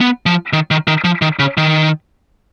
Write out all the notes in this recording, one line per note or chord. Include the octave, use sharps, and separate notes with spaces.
B3
F3
D#3
D#3
D#3
F3
D#3
C#3
D#3